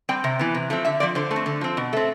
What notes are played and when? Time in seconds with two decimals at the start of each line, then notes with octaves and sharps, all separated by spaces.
0.09 G3 C4 G5
0.24 C3
0.39 E3 B3
0.55 C3
0.70 F3 A3 C4
0.85 D3 E5
1.00 F3 C4 D5
1.15 D3 C5
1.31 A3
1.36 C4
1.46 D3
1.61 F3 C4
1.77 B2
1.93 A3 C4